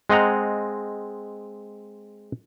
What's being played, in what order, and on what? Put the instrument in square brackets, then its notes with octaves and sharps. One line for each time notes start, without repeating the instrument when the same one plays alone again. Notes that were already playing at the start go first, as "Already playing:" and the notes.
[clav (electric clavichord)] G#3 C4 D#5 F#5 A#5